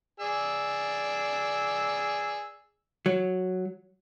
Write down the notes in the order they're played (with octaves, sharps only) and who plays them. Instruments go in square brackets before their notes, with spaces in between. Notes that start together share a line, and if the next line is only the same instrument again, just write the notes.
[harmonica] G#4 D5 E6
[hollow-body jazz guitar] F#3